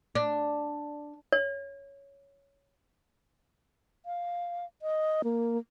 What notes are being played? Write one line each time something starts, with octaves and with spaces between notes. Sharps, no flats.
D4
C#5
F5
D#5
A#3